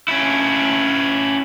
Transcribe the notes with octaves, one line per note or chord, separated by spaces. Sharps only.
C#4 E4